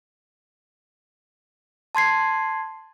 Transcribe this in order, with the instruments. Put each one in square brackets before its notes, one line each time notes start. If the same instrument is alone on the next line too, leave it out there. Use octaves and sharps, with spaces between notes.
[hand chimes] A5 C6 G#6 C7